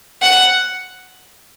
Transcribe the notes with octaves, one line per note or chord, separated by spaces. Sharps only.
F#5